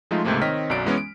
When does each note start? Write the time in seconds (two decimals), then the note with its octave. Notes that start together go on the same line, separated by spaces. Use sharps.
0.11 F3 G#3 A3 D#4 F4
0.24 C#2 G#2 C3 A3 A#3
0.41 D#3 C4 C#5 D#5 F6 B6
0.70 B1 F#2 F#3 D5 D7
0.86 E3 G#3 B3 C#4
0.98 D7